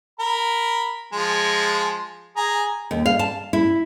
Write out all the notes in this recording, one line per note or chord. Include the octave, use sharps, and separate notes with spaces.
A#4 B5
F3 G#3
G#4 A#5
D#2
F5
A5
E4